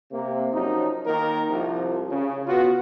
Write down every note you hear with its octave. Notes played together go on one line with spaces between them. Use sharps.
C3 A#3
F#2 F3 D#4
D#3 A#3 A#4
C2 F3
C#3
B3 F4 F#4